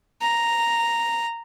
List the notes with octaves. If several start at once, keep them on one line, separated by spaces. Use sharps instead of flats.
A#5